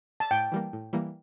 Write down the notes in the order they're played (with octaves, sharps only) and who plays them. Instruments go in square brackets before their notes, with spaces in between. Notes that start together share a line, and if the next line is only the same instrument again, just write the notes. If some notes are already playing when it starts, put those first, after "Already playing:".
[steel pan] A5
[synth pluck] A2 [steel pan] G5
[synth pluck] E3 G3 A#3
A2
E3 G3 A#3